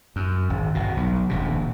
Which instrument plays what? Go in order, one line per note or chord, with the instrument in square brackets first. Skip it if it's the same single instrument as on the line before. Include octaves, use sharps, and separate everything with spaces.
[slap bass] F#2
G#1
G1 B2
B1
D#1 A#1 C3